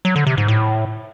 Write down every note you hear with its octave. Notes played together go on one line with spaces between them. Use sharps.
F#3
D3
C3
G#2
A2